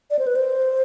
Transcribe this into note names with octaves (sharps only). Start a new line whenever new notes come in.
D5
C5
B4
C5